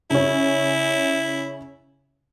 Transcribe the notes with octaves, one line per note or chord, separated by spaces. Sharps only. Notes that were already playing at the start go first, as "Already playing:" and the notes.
C#3 C#4 E4